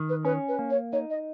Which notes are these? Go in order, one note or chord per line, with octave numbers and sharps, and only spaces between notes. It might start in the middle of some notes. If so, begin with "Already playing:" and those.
Already playing: D#3
B4
C#4 B4
B4
A#3
C#5
D#4 C#5
D#5